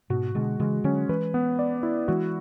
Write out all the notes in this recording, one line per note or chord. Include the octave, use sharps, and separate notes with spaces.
G#2 B2 F#4
B2 D3 G#3
C#3 E3 G#3
D3 F#3 C#4
E3 G#3 B4
B3
D5
E4
E3 G#3 F#4